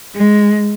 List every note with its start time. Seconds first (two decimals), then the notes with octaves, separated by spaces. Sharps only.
0.15 G#3